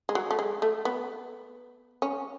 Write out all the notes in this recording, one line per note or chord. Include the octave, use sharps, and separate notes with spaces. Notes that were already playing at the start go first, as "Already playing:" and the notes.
G#3
F#3
A3
G#3
A3
B3
C#4